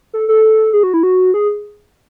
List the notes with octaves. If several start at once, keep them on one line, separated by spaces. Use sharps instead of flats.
A4
A4
G#4
F#4
E4
F#4
G#4